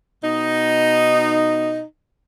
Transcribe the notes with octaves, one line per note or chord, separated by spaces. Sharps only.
B2 D#4